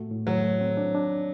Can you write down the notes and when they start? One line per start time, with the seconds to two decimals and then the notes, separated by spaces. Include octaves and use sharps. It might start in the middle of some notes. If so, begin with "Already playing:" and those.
Already playing: A2 A3 F#4
0.11 A2
0.27 A2 F#3
0.44 A3
0.61 C4
0.77 D4
0.95 D4